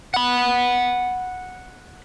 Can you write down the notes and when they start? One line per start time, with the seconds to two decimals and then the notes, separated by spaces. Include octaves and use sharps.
0.14 F#5 B5